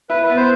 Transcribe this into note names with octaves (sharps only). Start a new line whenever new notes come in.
E4 B4
B4
B3
C5